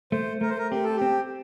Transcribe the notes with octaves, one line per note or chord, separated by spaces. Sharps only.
A3 C5
A3 A#4
C5
A#4
C4 G4
A4
G4
C4